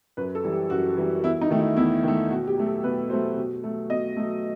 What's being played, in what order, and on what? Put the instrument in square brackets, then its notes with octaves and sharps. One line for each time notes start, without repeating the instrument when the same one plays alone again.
[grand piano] F#2 B4
A4
E3 G3
G4
F#2 F#4
E3 G3
E2 E4
D#4
D#3 A3
E4
E2 E4
D#3 A3
B2 F#4
G4
F#3 A3
A4
B2 B4
F#3 A3 C5
B2
F#3 A3
B2 D#5
F#3 A3